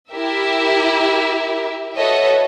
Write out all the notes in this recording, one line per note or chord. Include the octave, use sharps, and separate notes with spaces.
E4 G4 A#4 E5
F#4 A4 B4 C#5 D#5 E5